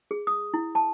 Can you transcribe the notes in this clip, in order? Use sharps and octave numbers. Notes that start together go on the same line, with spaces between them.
G#4
D#6
E4
A5